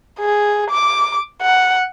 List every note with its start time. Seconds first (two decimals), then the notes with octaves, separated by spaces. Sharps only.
0.20 G#4
0.70 D6
1.43 F#5